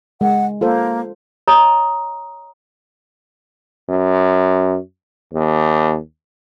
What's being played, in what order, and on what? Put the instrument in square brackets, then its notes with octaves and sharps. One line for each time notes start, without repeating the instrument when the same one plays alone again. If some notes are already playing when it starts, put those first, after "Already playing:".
[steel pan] G#3 [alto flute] F#5
[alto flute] A#3 [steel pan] F4 A4 C5
[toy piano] C#5 D#5 A#5 D#6
[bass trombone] F#2
D#2